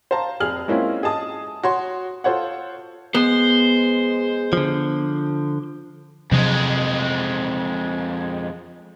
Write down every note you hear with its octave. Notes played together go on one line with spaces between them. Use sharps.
C5 F5 A5 A#5
F1 G#4 F6 F#7
G#3 A#3 C4 C#4 E4 F4
G#4 D#5 A5 D#6
F#4 C#5 C6
F4 A4 C5 C#5 F#5
G#3 B3 C5
D3 F3
F2 C3 F3 F#3 G#3